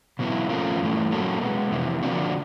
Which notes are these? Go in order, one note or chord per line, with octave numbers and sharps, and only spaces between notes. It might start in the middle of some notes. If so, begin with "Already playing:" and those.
B2 F#3 B3 E4
F3 A3 C#4 F4 A#4
G2 E3 A3
F#3 A#3 C#4 F#4 A4
B2 G#3 B3
F2 C3 E3
D3 F3 A#3 D4 F#4